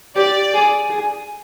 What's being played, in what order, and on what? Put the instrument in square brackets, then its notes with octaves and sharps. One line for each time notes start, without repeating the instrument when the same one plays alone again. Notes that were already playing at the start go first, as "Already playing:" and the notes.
[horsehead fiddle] G4 [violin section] D5
[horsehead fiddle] G#4
G#4